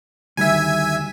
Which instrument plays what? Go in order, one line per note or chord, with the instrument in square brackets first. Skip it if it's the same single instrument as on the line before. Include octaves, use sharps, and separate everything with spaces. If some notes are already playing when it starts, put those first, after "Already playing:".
[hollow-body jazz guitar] D2 D#3 G3 [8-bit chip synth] E5 G#5